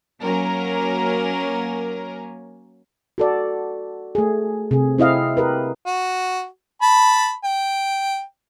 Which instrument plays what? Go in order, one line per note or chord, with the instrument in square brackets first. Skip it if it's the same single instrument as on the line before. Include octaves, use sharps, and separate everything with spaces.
[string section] F#3 A#3 C#4 A#4
[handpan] F#4 A4 D5
A3 G#4
C3 G#4
C4 E4 D#5 F5
G4 A#4 B4
[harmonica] F#4
A5 B5
G5